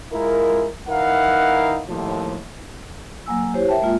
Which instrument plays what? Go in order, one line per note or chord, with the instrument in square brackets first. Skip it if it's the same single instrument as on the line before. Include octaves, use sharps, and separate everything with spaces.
[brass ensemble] G#3 E4 F4 A#4
E3 D#4 E4 A#4 F5 F#5
D#2 A2 F3
[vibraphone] F#3 A#3 G#5 E6
E4 G4 C5 C#5
A#4 E5 G5 A5
G#3 A#3 F4